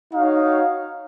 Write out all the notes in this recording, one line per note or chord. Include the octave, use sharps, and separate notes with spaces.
D#4 F#4 C#5 F5